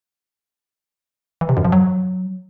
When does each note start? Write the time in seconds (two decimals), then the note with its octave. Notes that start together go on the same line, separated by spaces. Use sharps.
1.41 E3
1.49 C3
1.57 F#2
1.65 F3
1.72 F#3